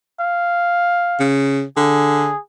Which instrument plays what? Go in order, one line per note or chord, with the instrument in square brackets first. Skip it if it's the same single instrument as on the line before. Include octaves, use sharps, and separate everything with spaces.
[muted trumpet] F5
[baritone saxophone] C#3
[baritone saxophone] D3 [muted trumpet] G#4